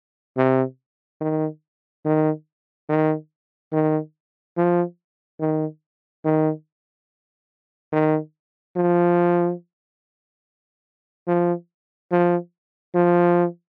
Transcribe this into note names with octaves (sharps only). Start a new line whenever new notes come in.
C3
D#3
D#3
D#3
D#3
F3
D#3
D#3
D#3
F3
F3
F3
F3